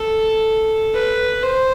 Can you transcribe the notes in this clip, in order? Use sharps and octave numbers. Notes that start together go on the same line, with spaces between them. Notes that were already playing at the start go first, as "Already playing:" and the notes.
Already playing: A4
B4
C5